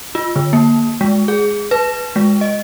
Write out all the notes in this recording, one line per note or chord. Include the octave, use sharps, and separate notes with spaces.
F4
D3
A#3
G#3
G#4
B4
G#3
D#5